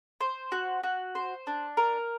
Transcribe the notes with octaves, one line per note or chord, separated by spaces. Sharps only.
C5
F#4
F#4
C5
D4
A#4